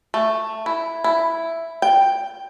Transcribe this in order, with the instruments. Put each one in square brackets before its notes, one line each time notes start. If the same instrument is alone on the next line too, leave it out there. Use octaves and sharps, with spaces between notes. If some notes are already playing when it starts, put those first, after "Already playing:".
[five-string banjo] A3
E4
E4
G5